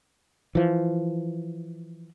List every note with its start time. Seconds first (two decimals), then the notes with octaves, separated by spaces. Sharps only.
0.55 E3 F3